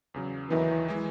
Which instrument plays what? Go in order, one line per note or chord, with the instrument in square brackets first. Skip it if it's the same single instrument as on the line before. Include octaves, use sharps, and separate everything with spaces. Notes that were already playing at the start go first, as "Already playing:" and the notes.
[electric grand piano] E2 C#3 F#3
[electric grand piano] D#2 D#3 F#3 B3 D#4 [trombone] E3
[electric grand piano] E3 G#3